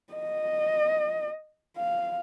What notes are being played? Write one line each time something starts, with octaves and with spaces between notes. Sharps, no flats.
D#5
F5